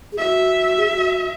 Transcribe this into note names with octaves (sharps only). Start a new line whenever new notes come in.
G#4
F#4 E5
G#4
F#4